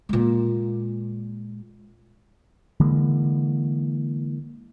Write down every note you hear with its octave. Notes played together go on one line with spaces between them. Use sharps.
A#2 G#3
D3 E3 G#3 A#3